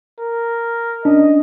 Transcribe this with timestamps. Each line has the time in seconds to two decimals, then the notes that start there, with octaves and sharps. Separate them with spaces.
0.20 A#4
1.05 C#4 D4 D#5